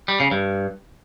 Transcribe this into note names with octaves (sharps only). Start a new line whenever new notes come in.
G3
C#3
G2